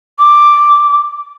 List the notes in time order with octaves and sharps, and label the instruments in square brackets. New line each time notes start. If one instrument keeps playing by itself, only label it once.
[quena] D6